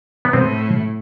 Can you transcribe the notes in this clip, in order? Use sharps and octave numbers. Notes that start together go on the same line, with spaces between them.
B3
A2 C4